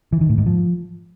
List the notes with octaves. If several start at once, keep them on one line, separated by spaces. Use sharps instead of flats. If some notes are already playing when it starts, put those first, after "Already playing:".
E3
D#3
A2
G#2
F3